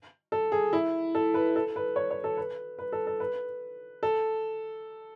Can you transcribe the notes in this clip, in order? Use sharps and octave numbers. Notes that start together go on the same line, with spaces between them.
A4
G#4
E4
A4
B4
A4
B4
C#5
C#5
A4
B4
B4
A4
A4
B4
A4